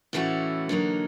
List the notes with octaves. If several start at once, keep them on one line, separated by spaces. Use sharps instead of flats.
A2 E3 A3 C#4 F#4
D3 F#3 A#3 D#4